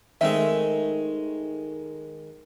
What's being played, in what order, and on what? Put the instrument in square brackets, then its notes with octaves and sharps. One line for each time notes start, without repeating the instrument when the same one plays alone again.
[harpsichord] D#3 G#3 [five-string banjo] A3 C4 E5